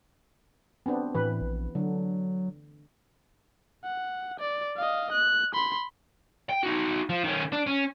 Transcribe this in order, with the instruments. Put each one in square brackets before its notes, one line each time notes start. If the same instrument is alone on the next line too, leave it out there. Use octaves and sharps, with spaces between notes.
[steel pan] B3 C4 D4
[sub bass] A2 [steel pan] E3 B4
[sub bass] A#1
[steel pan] D3 [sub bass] F#3
[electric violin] F#5
D5
D#5 F5
F#6
B5 C6
[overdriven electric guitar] G5
D#4 F#4
F3
D#3 C#4
D4
C#4